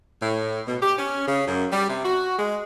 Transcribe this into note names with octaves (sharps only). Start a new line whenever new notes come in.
A2
B2
G4
C#4
C#3
F#2
G3
C3
F#4
G#3